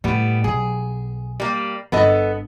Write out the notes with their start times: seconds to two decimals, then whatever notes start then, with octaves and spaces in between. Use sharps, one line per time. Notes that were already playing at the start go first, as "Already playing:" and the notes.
0.04 A2 G3 B3
0.44 B1 G#4
1.40 G3 A#3
1.92 G1 B3 A4 D#5